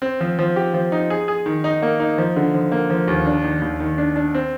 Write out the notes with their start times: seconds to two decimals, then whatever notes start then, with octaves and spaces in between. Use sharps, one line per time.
0.02 C4
0.20 F3
0.39 F3
0.56 G4
0.74 F3
0.92 D#4
1.10 G#4
1.28 G#4
1.46 D#3
1.64 D#4
1.82 A#3
2.00 D#4
2.18 F3
2.36 D3
2.54 F3
2.72 A#3
2.90 F3
3.08 D#2
3.26 D4
3.44 D#3
3.62 D#2
3.80 D#3
3.98 D4
4.16 D4
4.34 C4